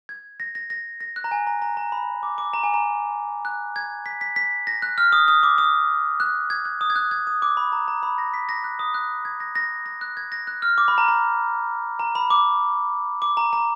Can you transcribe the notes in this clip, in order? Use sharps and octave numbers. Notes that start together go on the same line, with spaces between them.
G#6
A#6
A#6
A#6
A#6
F#6
A#5
G#5
A#5
A#5
A#5
B5
D6
D6
A#5
G#5
A#5
F#6
G#6
B6
B6
B6
A#6
F#6
F6
D#6
D#6
D6
D#6
F#6
G#6
F#6
D#6
G#6
F#6
G#6
D#6
D6
B5
A#5
A#5
B5
A#6
B6
A#6
F#6
D#6
F#6
G#6
A#6
A#6
A#6
F#6
G#6
A#6
F#6
F6
D6
B5
A#5
A#5
A#5
B5
D6
D6
A#5
A#5